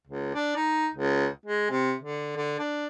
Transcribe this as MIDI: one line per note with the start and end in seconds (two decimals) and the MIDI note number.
0.07 0.33 37
0.35 0.52 62
0.56 0.88 63
0.94 1.28 37
1.46 1.66 56
1.70 1.94 48
2.02 2.34 50
2.36 2.57 50
2.59 2.87 62